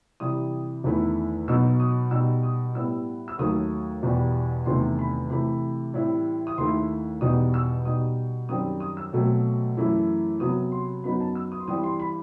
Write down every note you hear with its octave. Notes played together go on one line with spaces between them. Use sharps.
C3 E3 G3 D#6
E2 D#3 A3 E4
B2 F#3 B3 D#4 E6
D#6
B2 G3 D#4 E6
D#6
A2 G3 B3 E6
E6
D#2 D#3 F#3 A3 D#6
E2 B2 G3
E2 C3 D#3 A3 C6
B5
C3 E3 A3 B5
A2 E3 G3 C4 E4
D#6
D#2 D#3 A3 E4 C6
E2 B2 G3 D#4 D#6
E6
B2 G3 D#4 D#6
F#2 D#3 G3 C4 D#6
D#6
E6
B2 F#3 A3 C4
F#2 E3 A3 E4
C3 F#3 B3 D#6
C6
F#2 F#3 B3 D#4 B5
A5
E6
D#6
C6
G2 E3 G3 C4 D#6
C6
B5